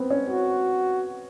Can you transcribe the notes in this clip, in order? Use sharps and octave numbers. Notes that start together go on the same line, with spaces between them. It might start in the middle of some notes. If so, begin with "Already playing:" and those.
Already playing: B3 C4
C#4
F#4